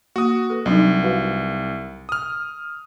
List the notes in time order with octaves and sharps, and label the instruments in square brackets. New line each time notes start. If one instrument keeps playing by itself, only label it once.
[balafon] A#3 [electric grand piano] F#4 D#6
[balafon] A4 B4
[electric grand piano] C2 [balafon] F#3 D4 D#4
[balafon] F#4 B4 F5
[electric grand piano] D#6 F6